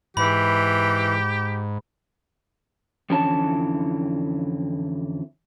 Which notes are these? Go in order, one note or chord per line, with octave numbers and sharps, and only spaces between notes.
G#2 E3 G4 B5
F2 D3 E3 C#4 E4 A5